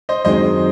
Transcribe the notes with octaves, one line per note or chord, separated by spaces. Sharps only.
C5 D#5
F#2 D#3 G#3 C4 C5 D#5